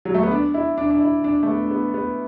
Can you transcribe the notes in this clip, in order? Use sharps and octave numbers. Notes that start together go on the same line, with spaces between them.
F#3
A3
B3
D4
E4
D4
D4
E4
D4
A3
B3
D4
B3
B3